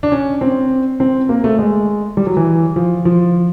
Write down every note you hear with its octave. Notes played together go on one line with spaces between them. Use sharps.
D4
C#4
C4
C4
A#3
A3
G#3
G3
F#3
E3
F3
F3